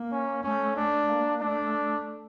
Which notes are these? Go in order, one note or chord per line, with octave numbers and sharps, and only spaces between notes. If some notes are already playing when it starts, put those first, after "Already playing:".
Already playing: A#3
C#4
A3 C#4
A3 D4
A#3
A3 D4